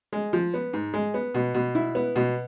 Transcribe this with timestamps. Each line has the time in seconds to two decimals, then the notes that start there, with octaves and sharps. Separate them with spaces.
0.13 G#3
0.33 F3
0.54 B3
0.73 G#2
0.94 G#3
1.14 B3
1.34 B2
1.54 B2
1.75 E4
1.95 B3
2.16 B2